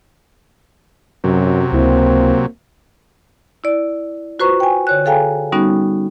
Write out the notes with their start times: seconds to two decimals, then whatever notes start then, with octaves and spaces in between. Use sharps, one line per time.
1.24 F#2 C3 F#3
1.72 C#2 A#3 C4 E4
3.64 E4 D5
4.39 F4 F#4 B4 C5 A#5 C#6
4.60 G5 G#5
4.87 D3 C#5 F#6
5.05 G#4 A4 F5 G5 G#5 A#5
5.52 G3 B3 C#4 D#4 F#4